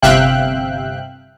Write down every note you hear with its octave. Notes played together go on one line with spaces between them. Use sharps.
G1 C3 E5 F5 G5 F#6